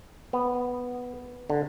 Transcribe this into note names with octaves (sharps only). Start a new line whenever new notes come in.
B3
D3